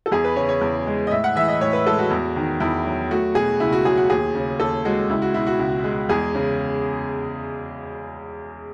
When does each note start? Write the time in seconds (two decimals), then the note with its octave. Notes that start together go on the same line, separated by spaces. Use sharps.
0.06 A4
0.11 E2 G#4
0.24 B4
0.36 C#3 C#5
0.49 C#5
0.61 E2
0.87 G#3
1.07 D#5
1.11 A2 E5
1.24 F#5
1.36 E3 E5
1.48 D#5
1.61 A2 C#5
1.73 B4
1.87 G#3 A4
1.99 F#4
2.10 E2
2.36 D#3
2.60 E2 E4
2.86 F#3
3.11 A3 F#4
3.35 B2 G#4
3.60 C#2 E4
3.72 F#4
3.85 F#3 G#4
3.97 F#4
4.10 D#2 G#4
4.35 C#3
4.60 D#2 A4
4.85 G#3 F#4
5.10 C#2 E4
5.22 F#4
5.34 B2 E4
5.47 F#4
5.59 C#2
5.84 G#3
6.09 E2 G#4
6.35 C#3